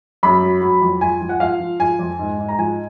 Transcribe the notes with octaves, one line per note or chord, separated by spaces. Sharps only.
F#2 B5
F#3
F#3
F2
F3 G#5
F3
F#5
F3 F5
F3
F3 G#5
F2
G#2
G#2
A#5
F3 G#5